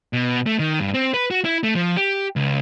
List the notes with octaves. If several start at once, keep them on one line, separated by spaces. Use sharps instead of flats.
B2
A3
D#3
G2
C4
B4
F#4
E4
A3
F3
G4
C#2